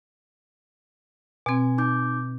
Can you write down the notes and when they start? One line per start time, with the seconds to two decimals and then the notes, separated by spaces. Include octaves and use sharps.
1.46 B2 C4 G#5 G#6
1.78 D#4 D6 G6